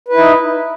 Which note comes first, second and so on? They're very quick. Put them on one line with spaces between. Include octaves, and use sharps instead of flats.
B4 E4 D#4